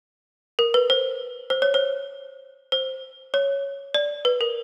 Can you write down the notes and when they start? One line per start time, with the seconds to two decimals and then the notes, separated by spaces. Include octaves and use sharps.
0.59 A#4
0.74 B4
0.90 C5
1.50 C5
1.62 C#5
1.74 C5
2.72 C5
3.34 C#5
3.94 D5
4.25 B4
4.41 A#4